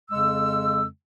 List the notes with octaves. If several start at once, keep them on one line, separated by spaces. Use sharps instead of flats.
F2 C#3 G#3 E6